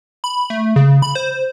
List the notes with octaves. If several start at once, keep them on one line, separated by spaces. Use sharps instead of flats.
B5
A3
C#3
B5
C5